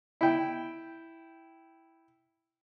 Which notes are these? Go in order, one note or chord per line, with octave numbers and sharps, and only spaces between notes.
E4 G5